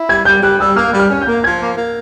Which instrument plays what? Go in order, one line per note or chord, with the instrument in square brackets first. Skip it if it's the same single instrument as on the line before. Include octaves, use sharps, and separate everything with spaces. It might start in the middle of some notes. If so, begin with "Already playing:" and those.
Already playing: [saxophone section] E4
[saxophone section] G3 [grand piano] G#6
[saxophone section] G3 [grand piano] G6
[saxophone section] G3 [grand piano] F#6
[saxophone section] G3 [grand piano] E6
[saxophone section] A#3 [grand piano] F6
[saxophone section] G3
[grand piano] F6
[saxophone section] C#4
[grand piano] G6
[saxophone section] A#3
[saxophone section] F3 [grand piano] G#6
[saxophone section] A#3
A#3